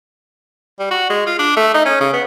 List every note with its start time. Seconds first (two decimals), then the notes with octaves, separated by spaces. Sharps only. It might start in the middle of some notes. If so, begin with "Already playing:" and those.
0.79 G3
0.91 F#4
1.10 G#3
1.26 F4
1.39 D4
1.57 A3
1.74 D#4
1.85 C#4
2.00 C#3
2.13 B3